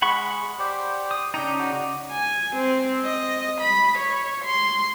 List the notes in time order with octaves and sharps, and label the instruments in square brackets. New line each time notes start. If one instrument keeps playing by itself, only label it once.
[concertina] G#3 [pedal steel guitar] F#5 B5 C#6
[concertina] G4 C5 D5
[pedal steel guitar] D#6
[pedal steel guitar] C#3 D#4 [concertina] D4 G5
[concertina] F#4 D5
[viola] G#5
C4
D#5
B5
C#5
C6